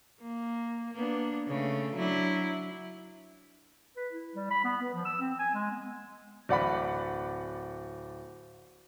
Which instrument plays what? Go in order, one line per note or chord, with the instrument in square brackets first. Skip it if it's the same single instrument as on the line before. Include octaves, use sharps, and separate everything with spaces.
[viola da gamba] A#3
A#3 B3 D4
C#3 A3
F#3 D4 E4
[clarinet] B4
E4
G3
B5
B3
B4
F3
E6
C4
G#5
G#3
B3
[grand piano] D1 D5 F#5 B5